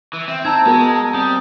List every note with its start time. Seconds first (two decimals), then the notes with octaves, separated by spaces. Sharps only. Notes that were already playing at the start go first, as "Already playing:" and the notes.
0.13 E3
0.28 C4 E5
0.45 D#4 A5 A#5 E6 G#6
0.66 G#3 B3 F#4 A#4
1.14 G3 C4 D#6